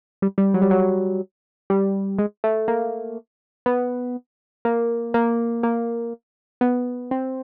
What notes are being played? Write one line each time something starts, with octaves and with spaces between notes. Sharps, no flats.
G3
G3
F#3
G3
F#3
G3
G#3
A3
A#3
B3
A#3
A#3
A#3
B3
C4